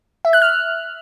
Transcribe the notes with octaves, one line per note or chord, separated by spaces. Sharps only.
E5
F#6
F6